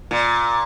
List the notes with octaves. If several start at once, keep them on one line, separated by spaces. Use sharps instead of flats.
A#2